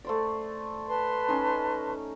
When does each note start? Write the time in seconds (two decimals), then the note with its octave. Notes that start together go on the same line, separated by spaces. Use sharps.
0.05 A3 C5 D5
0.88 B4 A5 C6
1.28 C#4 D#4